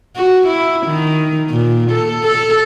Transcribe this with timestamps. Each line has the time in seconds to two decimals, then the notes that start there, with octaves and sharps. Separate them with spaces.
0.16 F#4
0.47 E4
0.87 D#3
1.50 A#2
1.91 A4
2.24 A4